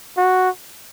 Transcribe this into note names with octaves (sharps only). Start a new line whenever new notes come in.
F#4